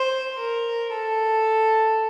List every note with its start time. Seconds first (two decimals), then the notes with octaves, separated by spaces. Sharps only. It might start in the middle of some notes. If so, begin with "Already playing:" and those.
Already playing: C5
0.38 A#4
0.93 A4